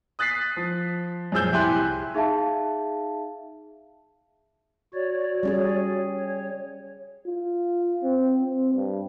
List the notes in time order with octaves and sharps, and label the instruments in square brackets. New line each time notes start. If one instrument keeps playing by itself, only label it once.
[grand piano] D#6 F#6 A6 B6 C7
F3
F#2 A#2 F3 G#4 E6 G6
C2 E4 G4 G#5 C6 F#6
[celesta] D#4 G#4 E5 F5 A5
[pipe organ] F#4 C#5 D5
[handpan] G3 C#4 G#4
[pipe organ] C#5
[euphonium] F4
C4
C4
G2